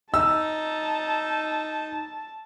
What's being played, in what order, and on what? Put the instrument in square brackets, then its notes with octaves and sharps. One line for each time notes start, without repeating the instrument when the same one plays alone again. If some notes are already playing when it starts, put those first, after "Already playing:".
[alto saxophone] D#4 [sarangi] A5 [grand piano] E6